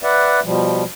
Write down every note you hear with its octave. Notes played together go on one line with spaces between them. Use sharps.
B4 D5 E5 F#5
B2 F3 G3